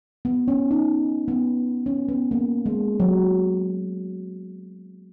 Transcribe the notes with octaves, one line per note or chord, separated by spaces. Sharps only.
B3
C#4
D#4
B3
C#4
B3
A#3
G#3
F#3